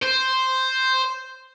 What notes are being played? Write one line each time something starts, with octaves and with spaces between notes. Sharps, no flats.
C5